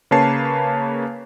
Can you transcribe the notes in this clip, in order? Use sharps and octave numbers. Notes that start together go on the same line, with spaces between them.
C#3 A#3 B4 C#5 A5 C7